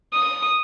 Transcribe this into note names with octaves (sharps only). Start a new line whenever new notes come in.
D#6